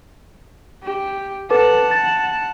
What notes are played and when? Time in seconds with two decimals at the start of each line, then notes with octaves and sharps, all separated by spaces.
0.83 G4
1.50 A4 B4 F#5 A5 D6
1.91 A6